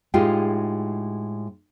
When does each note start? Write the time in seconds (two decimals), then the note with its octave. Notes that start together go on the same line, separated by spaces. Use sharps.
0.14 A2 G#3 D#4 F4 G4